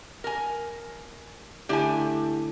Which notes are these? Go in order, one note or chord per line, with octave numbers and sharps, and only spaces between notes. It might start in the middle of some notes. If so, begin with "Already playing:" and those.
A#4 G#5
D3 A3 E4 G4 G#5